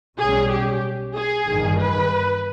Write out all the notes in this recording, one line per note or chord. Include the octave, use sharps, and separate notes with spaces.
B1 B2 G3 C#4 G#4
G4
G#4
G1 G2 D#3
B4